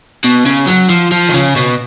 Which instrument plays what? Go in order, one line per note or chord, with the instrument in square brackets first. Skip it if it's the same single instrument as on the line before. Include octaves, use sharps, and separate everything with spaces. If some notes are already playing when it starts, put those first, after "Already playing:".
[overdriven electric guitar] B2
C#3
F#3
F3
F3
D#3
C#3
B2